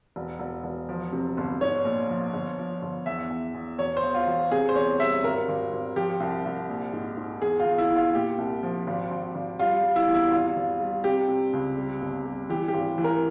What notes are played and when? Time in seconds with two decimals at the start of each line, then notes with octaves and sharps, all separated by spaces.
0.16 E1
0.39 E1
0.64 E1
0.89 F3
1.13 C3
1.37 G1
1.61 G#2 C#5
1.85 A#1
2.10 F3
2.33 G1
2.58 F3
2.82 G1
3.06 E2 E5
3.30 E2
3.54 E2
3.79 E1 C#5
3.97 C5
4.03 E2
4.14 F4
4.27 E1
4.51 C3 G#4
4.69 C5
4.75 E2 C#5
5.00 G3 E5
5.23 G#1 A#4
5.49 G#1
5.73 G#1
5.96 F3 G4
6.20 C2
6.45 C2
6.69 A#1
6.93 G#2
7.17 G#2
7.42 E2 G#4
7.60 F4
7.65 E2
7.78 E4
7.90 E2
7.96 F4
8.14 A#2 G4
8.38 C2
8.63 F3
8.87 G#1
9.11 G#1
9.35 G#1
9.59 G3 F4
9.83 G3
9.96 E4
10.07 E2
10.14 E4
10.31 G#1 F4
10.56 G#1
10.80 G3
11.04 C3 G4
11.28 C3
11.53 C#2
11.78 G3
12.01 G1
12.25 G3
12.50 E3 G4
12.68 G4
12.73 G#1
12.98 E3
13.04 A#4